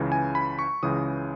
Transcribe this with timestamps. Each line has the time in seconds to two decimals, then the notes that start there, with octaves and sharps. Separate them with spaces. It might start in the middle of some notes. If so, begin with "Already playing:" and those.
Already playing: C#2 C#3 E3
0.12 G#5
0.35 B5
0.59 C#6
0.83 C#2 C#3 E3 D#6